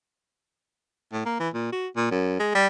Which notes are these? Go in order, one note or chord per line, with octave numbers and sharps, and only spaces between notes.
A2
A#3
E3
A#2
F#4
A#2
F#2
G#3
G3